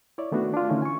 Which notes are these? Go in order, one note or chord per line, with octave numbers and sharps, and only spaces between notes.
E4 C#5 D5
D#3 A3 B3 D4 F#4
D4 F4
D3 D#3 A3 C#4 D#4 E4
G#5 C#6